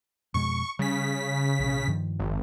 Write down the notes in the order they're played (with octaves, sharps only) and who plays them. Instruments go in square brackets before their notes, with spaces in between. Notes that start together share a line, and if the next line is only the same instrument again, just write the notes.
[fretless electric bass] F2 B2 G#3 [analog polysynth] C#6
[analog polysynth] C#3 B6 [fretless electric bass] G3
[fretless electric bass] A#1 C3
G2 D#3 F3
[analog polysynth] G#1